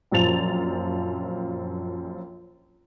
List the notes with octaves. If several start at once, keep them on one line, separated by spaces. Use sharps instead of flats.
A#1 F#2 F3 A6 F7